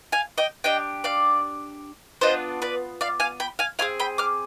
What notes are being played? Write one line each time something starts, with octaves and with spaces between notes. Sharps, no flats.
F5 G#5
D#5 G5
D4 G4 D#5 G5
D5 F5
B3 D4 F4 C5 D#5
B4 D5
D5 F5
F5 G#5
G5 B5
F5 G#5
C4 F4 G#4 F5 G#5
G5 B5
D6 F6